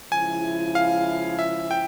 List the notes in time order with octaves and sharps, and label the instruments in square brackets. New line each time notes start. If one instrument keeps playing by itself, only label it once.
[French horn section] C#3 F3 G#3 E4 [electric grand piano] G#5
[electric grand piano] F5
E5
G5